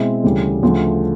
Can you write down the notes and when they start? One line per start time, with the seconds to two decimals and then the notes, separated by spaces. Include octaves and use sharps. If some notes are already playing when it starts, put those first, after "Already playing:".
Already playing: B2 G#3 C4 E4
0.24 D2 C#3 E3 G3
0.63 D2 C#3 F3 A3